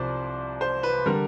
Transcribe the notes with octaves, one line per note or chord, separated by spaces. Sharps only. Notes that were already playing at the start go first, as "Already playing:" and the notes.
Already playing: C2 C3 F3 C5 D5
C5
B4
D3 G3 A#4